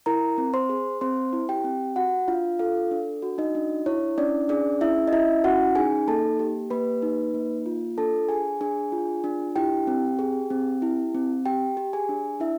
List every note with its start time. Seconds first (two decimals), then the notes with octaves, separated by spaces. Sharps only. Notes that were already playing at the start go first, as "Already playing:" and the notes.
0.06 E4 A#4 A#5
0.38 C4
0.54 C5 C6
0.69 G#4
1.01 C4 C5 C6
1.33 E4
1.49 G4 G5
1.64 C4
1.96 F#4 F#5
2.28 D4 F4 F5
2.59 F4 A4 F5
2.91 D4
3.22 F#4
3.38 D#4 D#5
3.55 D4
3.86 E4 C#5
4.18 C#4 D4 D5
4.49 D4 G#4 D5
4.81 C#4 E4 E5
5.08 D#5
5.13 E4 E5
5.44 C#4 F#4 F#5
5.75 D#4 G#4 G#5
6.07 A#3 A4 A5
6.39 G4
6.70 A#3 B4 B5
7.02 D#4
7.34 A#3
7.66 F4
7.98 D4 A4 A5
8.29 G#4 G#5
8.61 D4 G#4 G#5
8.92 F4
9.24 D4
9.56 E4 G4 G5
9.87 C4
10.19 G#4
10.50 C4
10.82 E4
11.15 C4
11.46 G4 G5
11.77 G4
11.93 G#4 G#5
12.09 D4
12.40 D4 E4 E5